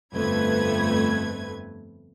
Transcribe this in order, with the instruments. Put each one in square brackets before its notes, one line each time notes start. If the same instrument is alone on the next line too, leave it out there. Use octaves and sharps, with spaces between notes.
[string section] G1 F2 A3 B4 G#6